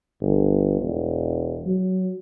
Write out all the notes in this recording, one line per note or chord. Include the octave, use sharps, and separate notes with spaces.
G1
E1
F#3